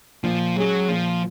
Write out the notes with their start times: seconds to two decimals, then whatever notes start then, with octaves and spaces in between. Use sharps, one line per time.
0.23 A#2 F3
0.56 F#3 G#3 C#4 G#4
0.88 A#2 F3